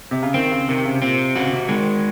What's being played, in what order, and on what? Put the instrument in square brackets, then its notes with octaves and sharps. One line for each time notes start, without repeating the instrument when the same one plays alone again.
[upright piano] C3
C#3
[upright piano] D#3 [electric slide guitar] C4
[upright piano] C#3
[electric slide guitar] C3 [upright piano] D#3
[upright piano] C#3
[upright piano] A#2 [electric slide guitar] C4
[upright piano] C#3 [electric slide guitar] F#4
[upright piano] C3
[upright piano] D#3 [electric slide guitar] G#3